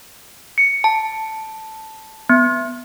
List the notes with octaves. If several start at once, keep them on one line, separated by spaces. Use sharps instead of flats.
C#7
A5
B3